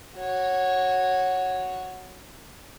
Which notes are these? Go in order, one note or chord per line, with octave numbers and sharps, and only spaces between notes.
F#4 C#5